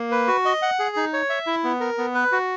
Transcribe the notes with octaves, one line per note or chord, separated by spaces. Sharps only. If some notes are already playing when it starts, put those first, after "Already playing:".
Already playing: A#3
B4
F#4
D#5
F#5
G#4
D#4
C#5
E5
E4
B3
A#4
B3
B4
F#4